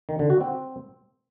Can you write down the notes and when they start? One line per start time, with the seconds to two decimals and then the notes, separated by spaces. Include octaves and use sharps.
0.09 D#3
0.19 D3
0.30 F#4
0.40 C4